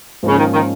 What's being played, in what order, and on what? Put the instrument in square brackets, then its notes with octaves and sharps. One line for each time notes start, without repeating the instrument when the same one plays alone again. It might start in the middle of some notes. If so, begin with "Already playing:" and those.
[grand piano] G#2 F3 A#3 C#4 [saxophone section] C#3
[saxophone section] D#3
D#3